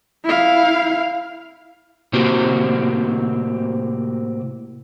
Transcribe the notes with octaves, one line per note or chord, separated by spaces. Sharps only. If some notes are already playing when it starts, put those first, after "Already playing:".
E4 F5
A2 C3 A#3 C4 F#4 G4